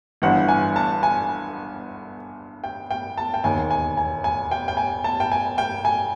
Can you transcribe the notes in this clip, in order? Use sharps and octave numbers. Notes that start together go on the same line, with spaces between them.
G1 G2 E3 F#5
G#5
A5
G#5
G5
G5
A5
G5
E1 D#2 D#3 G#5
G#5
G#5
G#5
G5
G5
G#5
A5
G5
G#5
G5
G#5